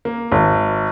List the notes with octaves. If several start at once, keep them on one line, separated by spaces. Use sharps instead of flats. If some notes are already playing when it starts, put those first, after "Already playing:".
A#3
G#1